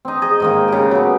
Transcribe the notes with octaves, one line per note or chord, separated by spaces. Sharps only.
C4 D#4
G#4 D#5
G#2 D#3 A#3
C#3 G4
F#3 B3